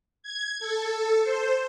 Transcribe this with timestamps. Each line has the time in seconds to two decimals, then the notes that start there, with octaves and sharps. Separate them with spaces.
0.23 G#6
0.60 A4
1.23 C5